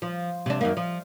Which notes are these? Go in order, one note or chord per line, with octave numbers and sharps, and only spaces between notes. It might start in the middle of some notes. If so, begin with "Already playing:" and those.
F3
C3 D4
F#2 D#3 A#3
F3